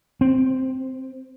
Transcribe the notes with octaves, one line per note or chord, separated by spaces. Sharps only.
C4